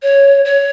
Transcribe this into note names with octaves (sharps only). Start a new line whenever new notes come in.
C#5
C#5